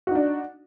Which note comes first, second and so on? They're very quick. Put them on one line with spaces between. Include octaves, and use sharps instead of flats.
F#4 D#4 D4